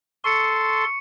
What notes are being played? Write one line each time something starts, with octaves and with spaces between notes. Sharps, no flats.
A4 C6 C#6 C#7